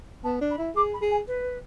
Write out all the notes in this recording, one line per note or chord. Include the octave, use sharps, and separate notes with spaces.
B3 A5
D4
B5
E4
G#4 D6
B5
G#4
G#5
B4